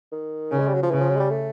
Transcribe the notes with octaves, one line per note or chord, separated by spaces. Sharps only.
D#3
C#3
G#3
G3
F#3
F3
C#3 E3
F3
F#3
G#3
G3
A3